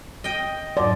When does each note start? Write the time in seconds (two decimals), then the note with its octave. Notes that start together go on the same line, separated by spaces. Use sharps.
0.24 D#5 G5
0.77 F2 G#2 F#3 D5